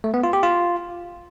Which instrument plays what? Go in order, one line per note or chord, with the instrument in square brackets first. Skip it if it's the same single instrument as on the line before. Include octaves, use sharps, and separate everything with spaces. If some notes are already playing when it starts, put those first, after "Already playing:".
[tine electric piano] A3
B3
F4
G4
F4